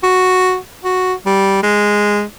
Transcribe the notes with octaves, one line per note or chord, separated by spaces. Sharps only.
F#4
F#4
G3
G#3